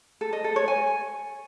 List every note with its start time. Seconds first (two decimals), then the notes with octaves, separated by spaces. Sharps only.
0.21 A4
0.33 D#5
0.44 A4
0.56 C#5
0.68 G#5